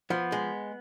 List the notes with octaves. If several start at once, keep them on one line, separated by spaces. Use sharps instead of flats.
F3 B3
G#3